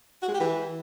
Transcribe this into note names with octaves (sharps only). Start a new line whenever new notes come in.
F#4
G#3
G4
E3